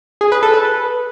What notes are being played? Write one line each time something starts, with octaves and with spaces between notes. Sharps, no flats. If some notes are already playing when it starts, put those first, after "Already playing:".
G#4
B4
A4
B4